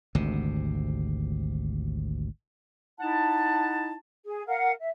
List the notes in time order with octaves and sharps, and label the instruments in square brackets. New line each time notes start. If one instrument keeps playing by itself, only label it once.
[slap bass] G#1 D2 C3
[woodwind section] D#4 E4 F#5 A5
[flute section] G#4
A#4 F5 F#5
E5